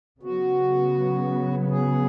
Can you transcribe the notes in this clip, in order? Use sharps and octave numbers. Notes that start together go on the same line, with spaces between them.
C#3 F#3 B3 F#4
G#4